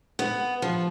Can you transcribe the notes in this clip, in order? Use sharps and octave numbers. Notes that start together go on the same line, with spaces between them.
B3
F3